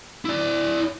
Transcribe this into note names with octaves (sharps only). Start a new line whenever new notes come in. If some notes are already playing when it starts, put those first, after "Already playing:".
E4 D5